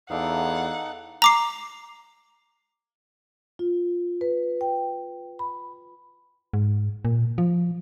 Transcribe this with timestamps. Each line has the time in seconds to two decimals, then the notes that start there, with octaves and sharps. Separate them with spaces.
0.10 E2 D#4 A4 D5 F5 F#5
1.22 A#5 D6 C7
3.59 F4
4.21 B4
4.61 G5
5.39 B5
6.53 G#2
7.05 A#2
7.38 F3